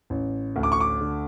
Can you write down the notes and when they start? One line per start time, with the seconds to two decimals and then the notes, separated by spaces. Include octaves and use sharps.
0.10 A1
0.56 D2
0.63 D6
0.72 C#6
0.80 D6
1.01 D3